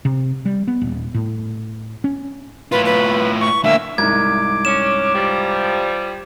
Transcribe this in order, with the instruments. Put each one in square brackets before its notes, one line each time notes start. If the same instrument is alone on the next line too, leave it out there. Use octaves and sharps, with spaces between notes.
[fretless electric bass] C3
G3
B3
D#1
A2
C#4
[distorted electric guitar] A2 F4 [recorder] B4
[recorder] B4
C#6
[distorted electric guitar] D2 A#3 [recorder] E5
[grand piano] C2 G#2 [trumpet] D6 [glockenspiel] G#6
[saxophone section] C#4 [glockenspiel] E7
[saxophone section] F3 G3